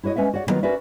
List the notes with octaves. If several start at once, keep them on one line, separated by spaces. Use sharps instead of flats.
E4 F#4 C#5 D#5
G#3 C#4 B4 E5 F#5
F#4 C#5 D5 F#5
D3 D#3 F#3 B3 F4 F#4
C#4 F#4 A#4 B4 D5 E5